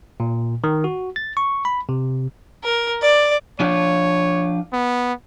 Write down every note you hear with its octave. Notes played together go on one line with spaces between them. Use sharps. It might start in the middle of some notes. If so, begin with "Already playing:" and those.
A#2
D#3
F#4
A6
C#6
B5
C3
A#4
D5
F3 D4 F4 C#5
B3